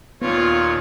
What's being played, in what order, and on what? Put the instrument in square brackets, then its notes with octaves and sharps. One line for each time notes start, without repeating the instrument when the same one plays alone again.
[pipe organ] D#2 A#2 [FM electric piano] B3 [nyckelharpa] F4 [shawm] C#5